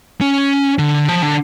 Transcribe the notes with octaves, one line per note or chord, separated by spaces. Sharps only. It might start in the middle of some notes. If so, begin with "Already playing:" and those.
C#4
D3
F3
D3